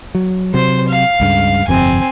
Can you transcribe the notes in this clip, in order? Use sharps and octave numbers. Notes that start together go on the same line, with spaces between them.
F#3
C3 F#3 C5
F5
C#2 G2 C#3
G1 F2 C3 C4 G#5